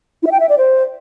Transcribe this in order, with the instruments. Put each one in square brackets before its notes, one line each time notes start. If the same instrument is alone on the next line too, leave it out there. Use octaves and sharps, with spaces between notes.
[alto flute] E4
E5
G5
E5
D5
C5